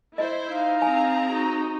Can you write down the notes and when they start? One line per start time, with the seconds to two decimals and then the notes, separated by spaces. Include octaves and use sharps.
0.18 E4 C5 D#5
0.49 D#4 F5
0.82 C4 G#4 G#5 A#5
1.28 D#4 F#4